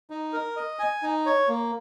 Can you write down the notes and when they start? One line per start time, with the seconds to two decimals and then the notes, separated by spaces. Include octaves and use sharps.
0.10 D#4
0.33 A#4
0.56 D#5
0.79 G#5
1.03 D#4
1.26 C#5
1.48 A#3